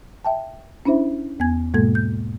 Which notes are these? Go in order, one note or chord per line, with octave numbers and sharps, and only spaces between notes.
E5 G5 A5
C#4 D4 E4 C5 E5
E2 B3 G#5 G#6
G#2 B2 G#3 A#3 A4 G#6
G6